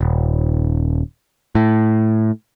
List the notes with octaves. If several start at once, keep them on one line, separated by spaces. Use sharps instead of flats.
D#1
A2